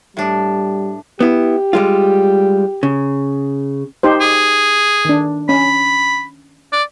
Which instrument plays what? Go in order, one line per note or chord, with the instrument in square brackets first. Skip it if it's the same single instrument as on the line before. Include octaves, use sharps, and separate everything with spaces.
[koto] A2 D4 [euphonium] G3
[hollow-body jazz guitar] B3 E4 [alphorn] G4
[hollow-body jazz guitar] G3 G#3 F4
C#3
[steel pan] D#4 G4 C5
[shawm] G#4
[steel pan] D#3 D4
[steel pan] C#4 [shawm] B5
[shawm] D5